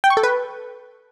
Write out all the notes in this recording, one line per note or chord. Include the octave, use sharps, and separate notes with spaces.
G5
C#6
A4
B4